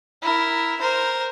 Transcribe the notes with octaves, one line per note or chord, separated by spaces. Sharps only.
E4 A#4
A#4 C5